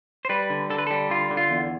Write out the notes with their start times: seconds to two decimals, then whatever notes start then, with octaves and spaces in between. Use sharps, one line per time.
0.25 C5
0.29 G3 B4
0.50 D3
0.70 D3 A4
0.78 B4
0.87 G3 A4
1.10 D3 F4
1.31 D3
1.37 F4
1.51 E2